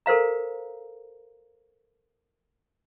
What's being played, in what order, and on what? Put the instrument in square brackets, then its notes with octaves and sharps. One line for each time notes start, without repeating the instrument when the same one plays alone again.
[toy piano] A4 A#4 C5 F5 A#5